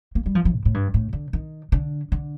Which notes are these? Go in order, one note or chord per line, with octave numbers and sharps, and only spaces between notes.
A#3
G3
F3
F3
A2
A2
G2
A2
D3
D#3
D3
D3